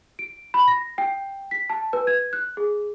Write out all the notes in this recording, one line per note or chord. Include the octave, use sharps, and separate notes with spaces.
D7
B5
A#6
G5
B6
A5
B4
G#6
F#6
G#4